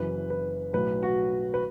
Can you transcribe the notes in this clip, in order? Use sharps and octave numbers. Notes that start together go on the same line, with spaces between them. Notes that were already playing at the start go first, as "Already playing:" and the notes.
Already playing: F#1 F#2 E3 B4
B4
B1 A2 F#3 B4
F#4
B4